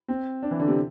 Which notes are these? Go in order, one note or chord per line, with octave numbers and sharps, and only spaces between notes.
C4
D4
E3
D3
C3